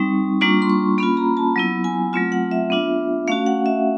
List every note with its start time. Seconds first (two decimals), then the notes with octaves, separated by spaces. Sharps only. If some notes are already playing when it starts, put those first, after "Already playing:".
Already playing: G3 C4 D#4 C#6
0.41 G3 A#3 D4 F4 C#6
0.62 C6
0.70 C#6
0.98 A#3 C#4 F4 B5
1.17 A#5
1.37 A5
1.56 F#3 B3 E4
1.84 G#5
2.13 F#3 A3 C4 F4
2.32 F#5
2.51 E5
2.70 B3 D4 F4
3.28 A3 C#4 F#4 F5
3.46 F#5
3.66 E5